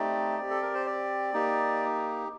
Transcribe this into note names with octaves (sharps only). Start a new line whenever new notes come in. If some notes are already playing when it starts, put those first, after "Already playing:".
Already playing: A3 C4 D#4 G4 D5
C4 G4
A4
A#4
C5
D5
A#3 D#4 G4